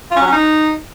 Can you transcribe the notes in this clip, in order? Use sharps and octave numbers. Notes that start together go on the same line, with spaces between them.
F4
C#4
F#3
C#4
D#4